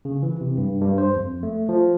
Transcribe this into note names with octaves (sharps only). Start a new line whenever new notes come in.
C#3
E3
C3
G2
G2
C5
F2
A3
F3